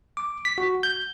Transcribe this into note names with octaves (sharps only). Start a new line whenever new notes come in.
D6
B6
F#4
G6